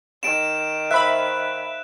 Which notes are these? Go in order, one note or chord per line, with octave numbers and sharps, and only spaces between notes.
D#3 D7 E7
C5 E5 F5 B5 F#6